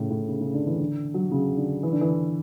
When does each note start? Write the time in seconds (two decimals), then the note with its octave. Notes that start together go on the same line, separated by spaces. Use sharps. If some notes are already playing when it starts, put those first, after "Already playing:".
Already playing: A2 C#3
0.10 A2
0.28 C#3
0.41 C#3
0.54 D3
0.67 E3
0.80 D3
1.14 F#3
1.31 C#3
1.57 D3
1.83 E3
1.92 D3
2.01 E3